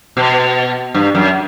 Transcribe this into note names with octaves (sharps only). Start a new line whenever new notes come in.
B2
G2
F#2